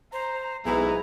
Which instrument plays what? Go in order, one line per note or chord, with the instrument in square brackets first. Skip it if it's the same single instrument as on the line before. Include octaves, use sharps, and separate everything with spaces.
[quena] C5 [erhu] A#5
[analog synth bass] B1 [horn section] G#2 B3 E4 [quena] G#5 [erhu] A#5